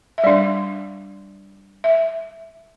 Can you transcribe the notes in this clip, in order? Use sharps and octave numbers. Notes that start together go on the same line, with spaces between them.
E5
G3 D4 D5
E5